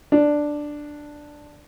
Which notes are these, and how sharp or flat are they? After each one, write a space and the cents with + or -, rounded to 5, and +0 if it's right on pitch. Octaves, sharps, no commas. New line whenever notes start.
D4 +5